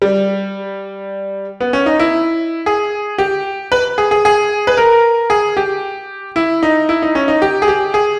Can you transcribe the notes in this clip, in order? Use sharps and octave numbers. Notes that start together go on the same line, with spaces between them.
G3
B3
C#4
D#4
E4
G#4
G4
B4
G#4
G#4
G#4
B4
A#4
G#4
G4
E4
D#4
E4
D#4
C#4
D#4
G4
G#4
G4
G#4